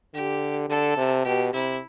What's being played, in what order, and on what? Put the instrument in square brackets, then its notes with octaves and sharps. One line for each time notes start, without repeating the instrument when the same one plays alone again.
[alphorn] D3 [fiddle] G4
[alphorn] D3 [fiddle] A4
[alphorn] C3
[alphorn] B2 [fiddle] G4
[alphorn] C3 [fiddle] E4